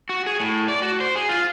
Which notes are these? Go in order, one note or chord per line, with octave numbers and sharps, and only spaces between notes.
F#4
G#4
A2
D5
F#4
C5
G#4
F4